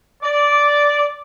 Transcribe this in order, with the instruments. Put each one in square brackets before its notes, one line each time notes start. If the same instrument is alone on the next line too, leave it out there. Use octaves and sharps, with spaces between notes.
[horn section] D5